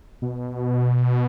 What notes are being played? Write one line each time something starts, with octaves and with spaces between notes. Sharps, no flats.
B2